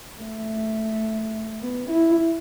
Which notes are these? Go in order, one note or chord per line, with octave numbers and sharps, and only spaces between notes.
A3
B3
E4